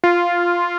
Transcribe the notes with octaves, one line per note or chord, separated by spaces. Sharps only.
F4